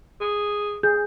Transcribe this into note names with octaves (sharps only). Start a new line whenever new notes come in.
G#4
G#4 G6